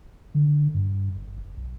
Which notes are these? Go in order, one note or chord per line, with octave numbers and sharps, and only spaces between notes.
D3
G2
G1
F1
B1